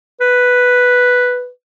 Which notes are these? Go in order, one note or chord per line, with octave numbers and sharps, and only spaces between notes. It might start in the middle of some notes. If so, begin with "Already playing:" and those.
B4